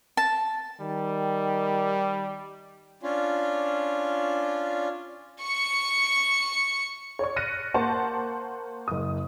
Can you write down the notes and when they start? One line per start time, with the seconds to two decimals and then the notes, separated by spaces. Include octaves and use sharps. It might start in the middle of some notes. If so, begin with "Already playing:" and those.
0.17 A5
0.81 D#3 G3
3.03 C#4 D4 F4
5.43 C#6 C#7
7.19 C#5 D5 C#6
7.36 F6 F#6 A6 A#6 C#7 D#7
7.74 A#3 C5 F#5 A5 C6 C#6
8.88 F#1 D#6